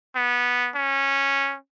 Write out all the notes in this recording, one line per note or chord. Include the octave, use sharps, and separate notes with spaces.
B3
C#4